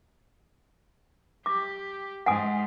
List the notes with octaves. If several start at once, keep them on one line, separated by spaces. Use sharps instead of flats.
G4 D6
G#2 F#5 G#5 D#6